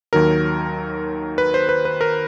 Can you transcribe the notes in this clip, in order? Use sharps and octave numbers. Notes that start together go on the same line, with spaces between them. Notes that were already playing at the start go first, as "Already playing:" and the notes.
D#2 D#3 F#3 A#4
B4
C5
B4
B4
A#4